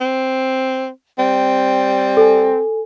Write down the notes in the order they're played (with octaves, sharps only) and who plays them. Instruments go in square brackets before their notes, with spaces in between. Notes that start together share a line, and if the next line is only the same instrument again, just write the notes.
[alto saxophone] C4
[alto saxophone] G3 [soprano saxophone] C4
[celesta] A4 G#5